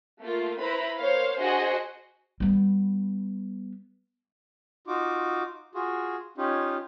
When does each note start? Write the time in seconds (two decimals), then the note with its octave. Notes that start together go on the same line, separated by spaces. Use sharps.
0.21 A3 A#3 F4
0.61 E4 B4 C5 A#5 B5
0.99 A#3 C5 C#5 F5
1.39 D4 F#4 G#4 C5 D#5 F#5
2.40 G3 B3
4.87 D#4 F4 F#4 D6
5.75 F4 F#4 G#4
6.38 C#4 D#4 F4 G4